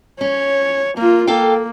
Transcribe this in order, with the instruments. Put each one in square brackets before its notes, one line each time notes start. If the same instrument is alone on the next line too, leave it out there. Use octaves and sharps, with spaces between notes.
[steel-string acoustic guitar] C#4 [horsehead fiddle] C#5
[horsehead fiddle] A#3 F4 [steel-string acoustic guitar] A#4
[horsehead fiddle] A#3 [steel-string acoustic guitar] A4 F5 G5